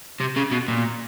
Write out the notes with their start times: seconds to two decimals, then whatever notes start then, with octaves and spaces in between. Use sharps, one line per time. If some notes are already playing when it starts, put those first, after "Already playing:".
0.20 C3
0.37 C#3
0.52 B2
0.68 A#2